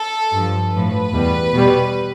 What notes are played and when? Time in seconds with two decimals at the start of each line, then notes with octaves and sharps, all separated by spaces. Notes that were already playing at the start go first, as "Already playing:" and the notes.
Already playing: A4
0.32 G2 F3
0.73 A2 F3 B4
1.14 E2 B2 G3
1.55 B2 G3